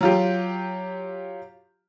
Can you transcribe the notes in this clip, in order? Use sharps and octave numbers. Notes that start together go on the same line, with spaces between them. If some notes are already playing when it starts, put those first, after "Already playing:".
F#3 F4 G4